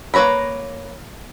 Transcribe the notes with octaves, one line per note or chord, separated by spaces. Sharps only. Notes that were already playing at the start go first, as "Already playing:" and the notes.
A#3 B4 C#5 A#5 B5